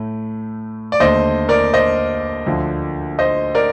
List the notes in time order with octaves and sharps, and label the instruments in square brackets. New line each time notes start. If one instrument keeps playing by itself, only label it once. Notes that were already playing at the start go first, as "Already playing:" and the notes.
Already playing: [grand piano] A2 A3
D5
D#2 D3 A3 C5 D#5
A#4 D5
C5 D#5
D2 D3 F3 A3
C5 D#5
A#4 D5